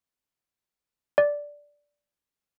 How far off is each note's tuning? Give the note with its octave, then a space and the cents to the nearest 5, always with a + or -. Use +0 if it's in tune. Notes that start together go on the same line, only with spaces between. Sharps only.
D5 -5